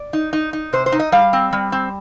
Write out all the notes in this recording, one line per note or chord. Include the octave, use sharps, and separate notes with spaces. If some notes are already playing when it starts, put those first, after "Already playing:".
Already playing: D5
D#4
D#4
D#4
C3 C5
C5
D#4
D#5
G3 F5
C4
G3
C4